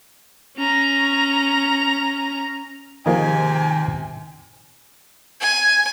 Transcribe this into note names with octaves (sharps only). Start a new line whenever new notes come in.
C#4 A#5
G#2 C3 D#3 F3 A#3 D#4 G#5
G#5